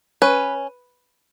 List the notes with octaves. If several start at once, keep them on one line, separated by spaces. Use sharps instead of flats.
C#4 B4